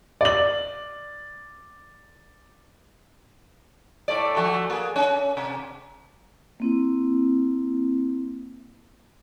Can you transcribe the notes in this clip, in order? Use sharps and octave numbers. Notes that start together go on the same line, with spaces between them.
D5 F#7
A2 A3 D5
F3 A3 F#4
A#3 G#4
C#4
C3
A#3 C4 E4